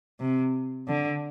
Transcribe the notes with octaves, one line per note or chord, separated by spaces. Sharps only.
C3
D3